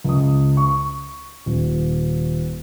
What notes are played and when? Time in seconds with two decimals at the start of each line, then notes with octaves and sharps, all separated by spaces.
0.04 C#2 D#6
0.57 C#6
1.46 D#1